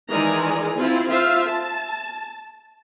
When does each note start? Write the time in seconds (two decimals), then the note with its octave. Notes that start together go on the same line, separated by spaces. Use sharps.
0.12 D#3 E3 G#3 D5 G#5 A#5
0.79 C4 E4 F4
1.09 F4 C5 E5 F5
1.48 A5